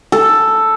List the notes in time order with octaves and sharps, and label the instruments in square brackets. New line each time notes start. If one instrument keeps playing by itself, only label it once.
[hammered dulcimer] A4